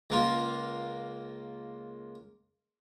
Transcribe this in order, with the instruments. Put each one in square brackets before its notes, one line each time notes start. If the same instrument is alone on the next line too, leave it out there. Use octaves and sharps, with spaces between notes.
[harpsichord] C#2 A#3 F4